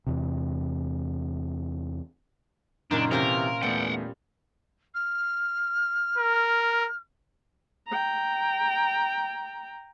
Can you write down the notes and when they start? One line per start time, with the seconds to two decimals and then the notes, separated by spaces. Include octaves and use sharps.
0.07 E2 C3
2.91 F#2 A#2 C#3 D4 D#4
3.11 C3 E3 C#4 F4 A#4 C5
3.63 E2 G3 A3 B3 F#5 G5
4.95 F6
6.18 A#4
7.87 G5 A#5